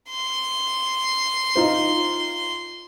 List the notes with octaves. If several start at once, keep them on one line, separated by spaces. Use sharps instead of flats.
C6
D#4 F4 C5